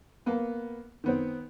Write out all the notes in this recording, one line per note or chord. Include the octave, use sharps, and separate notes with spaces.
A#3 B3
D#3 B3 C4